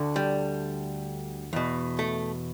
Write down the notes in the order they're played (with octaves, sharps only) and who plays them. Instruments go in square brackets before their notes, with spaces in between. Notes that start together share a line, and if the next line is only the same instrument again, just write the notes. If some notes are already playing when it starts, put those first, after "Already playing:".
Already playing: [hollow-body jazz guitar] D2 D3
G3
E2 B2
A3